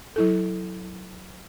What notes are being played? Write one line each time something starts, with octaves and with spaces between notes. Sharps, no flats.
F#3 E4 A4